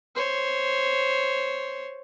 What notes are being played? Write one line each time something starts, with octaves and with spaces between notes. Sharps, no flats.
C5 C#5